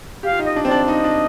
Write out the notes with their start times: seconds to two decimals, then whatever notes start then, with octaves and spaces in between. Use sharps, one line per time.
0.23 G4 F5
0.32 F4
0.39 D#4
0.45 D#5
0.56 D4
0.65 C4 D5
0.71 D4
0.88 D#4 D#5
1.04 D4